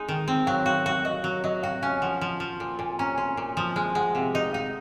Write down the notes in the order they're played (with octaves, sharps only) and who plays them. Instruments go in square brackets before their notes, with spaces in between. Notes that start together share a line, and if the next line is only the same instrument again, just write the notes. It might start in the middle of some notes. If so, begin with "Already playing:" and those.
Already playing: [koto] G#3 D#4
D#3
C4
[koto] F#3 [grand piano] F5
[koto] F#4 [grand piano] F5
[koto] F#4 [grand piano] F5
[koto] F#4 [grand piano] D#5
[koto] F#3
[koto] F#3 [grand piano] D#5
[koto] F#4 [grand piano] F5
[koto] C#4 [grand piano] F5
[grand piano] G#5
[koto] F3 [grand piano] F#5
[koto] F3
F3
A#2
[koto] A#2 [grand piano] G#5
[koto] C#4 [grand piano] A#5
[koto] C#4 [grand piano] C6
[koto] A#2 [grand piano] C6
[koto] F3 [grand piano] D#6
[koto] G#3 [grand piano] F6
[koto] G#3 [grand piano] F#5
[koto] C3 [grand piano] F5
[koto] D#4 [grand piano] D#5
[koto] D#4 [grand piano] F5